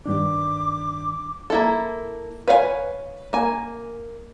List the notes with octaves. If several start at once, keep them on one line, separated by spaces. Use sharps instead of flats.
G2 D#3 D4 D6
A#3 E4 A4
B4 C#5 F5 F#5 G#5
A#3 G#5